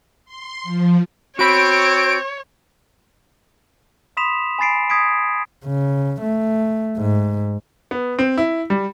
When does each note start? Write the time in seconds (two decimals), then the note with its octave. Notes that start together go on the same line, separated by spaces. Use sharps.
0.25 C6
0.63 F3
1.39 C4 F#4 C#5 B5 D7
4.17 B5 C6 D#6 B6 E7 F7
4.59 G#5 B5 A6 C7 D7
4.90 D#6 G#6 B6 D7
5.66 C#3
6.21 A3
6.98 G#2
7.91 B3
8.19 C4
8.38 E4
8.70 G3